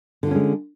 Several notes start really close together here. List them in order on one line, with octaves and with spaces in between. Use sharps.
D3 F4 C#4 G#3